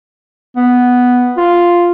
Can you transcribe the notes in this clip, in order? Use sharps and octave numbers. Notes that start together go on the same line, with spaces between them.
B3
F4